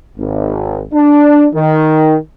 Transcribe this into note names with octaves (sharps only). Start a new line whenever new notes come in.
G#1
D4
D#3